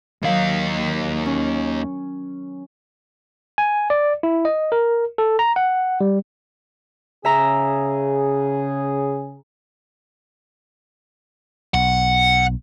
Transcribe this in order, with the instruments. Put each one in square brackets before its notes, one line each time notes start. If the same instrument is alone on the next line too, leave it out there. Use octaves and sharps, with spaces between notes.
[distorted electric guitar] D#2 F5 [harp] D#3 F#3
[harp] C#4
[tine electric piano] G#5
D5
E4
D#5
A#4
A4
A#5
F#5
G3
[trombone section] C#3 G#4 [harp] E5 A#5
[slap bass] B1 [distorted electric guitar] F#5